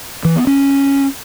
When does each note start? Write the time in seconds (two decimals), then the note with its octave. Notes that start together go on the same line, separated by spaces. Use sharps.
0.25 E3
0.36 B3
0.47 C#4